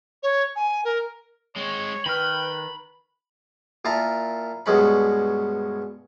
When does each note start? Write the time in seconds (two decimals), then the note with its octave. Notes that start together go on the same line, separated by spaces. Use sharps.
0.23 C#5
0.56 G#5
0.85 A#4
1.56 G#3 C4 C#5
2.06 D#3 B4 G5 B5 F6
3.85 A#2 E4 F4 A#4 A5 D#6
4.66 G2 B2 G#3 C#4 B5